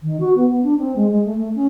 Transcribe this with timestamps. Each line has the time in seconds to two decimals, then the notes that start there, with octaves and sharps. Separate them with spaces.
0.02 D#3
0.20 F#4
0.35 B3
0.48 B3
0.63 D4
0.78 C4
0.96 G#3
1.11 G#3
1.25 A3
1.37 A3
1.55 C#4